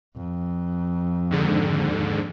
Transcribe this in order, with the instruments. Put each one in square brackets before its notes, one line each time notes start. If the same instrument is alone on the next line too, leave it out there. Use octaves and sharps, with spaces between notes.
[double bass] F2
[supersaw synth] D#2 G#2 D3